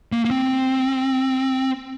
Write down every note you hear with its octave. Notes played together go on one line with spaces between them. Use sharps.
A#3
A#3
C4